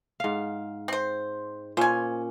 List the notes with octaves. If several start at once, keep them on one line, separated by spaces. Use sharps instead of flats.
G#2 F5
C4 C5
A#2 C#4 C5 G#5